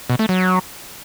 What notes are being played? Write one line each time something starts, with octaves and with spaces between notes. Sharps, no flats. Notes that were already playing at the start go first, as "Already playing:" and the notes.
B2
A3
F#3